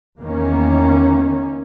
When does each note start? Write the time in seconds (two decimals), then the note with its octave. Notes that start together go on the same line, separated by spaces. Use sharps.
0.20 E2 D#3 A#3 C#4